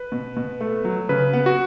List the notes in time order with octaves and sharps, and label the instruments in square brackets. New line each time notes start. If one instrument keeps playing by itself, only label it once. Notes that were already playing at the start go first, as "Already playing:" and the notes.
Already playing: [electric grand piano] B4
[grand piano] B2
B2
A3
F#3
[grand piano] C#3 [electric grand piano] B4
[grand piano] B3
[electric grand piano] F#4